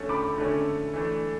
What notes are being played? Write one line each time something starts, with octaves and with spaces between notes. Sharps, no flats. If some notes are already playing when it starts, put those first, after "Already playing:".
Already playing: D3 A3 C#4
B5 D6
D3 A3 C#4
E3 A3 D4